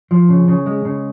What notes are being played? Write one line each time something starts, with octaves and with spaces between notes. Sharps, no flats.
F3
C#3
C#3
G#3
C#3